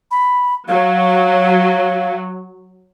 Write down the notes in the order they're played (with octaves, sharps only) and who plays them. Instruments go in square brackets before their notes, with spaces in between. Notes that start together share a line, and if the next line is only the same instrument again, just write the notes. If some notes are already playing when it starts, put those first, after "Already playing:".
[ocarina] B5
[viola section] F#3 [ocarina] F5